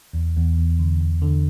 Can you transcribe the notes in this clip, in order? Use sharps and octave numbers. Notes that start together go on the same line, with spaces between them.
E2
E2
E2
D3
E2
D3